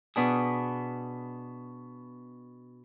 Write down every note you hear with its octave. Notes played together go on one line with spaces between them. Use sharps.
B2 B3 D4 G#4